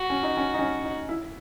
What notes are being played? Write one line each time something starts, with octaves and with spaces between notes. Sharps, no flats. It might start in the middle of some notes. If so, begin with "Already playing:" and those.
Already playing: F#4
C#4
D#4
C#4
D#4
C#4
D#4
E4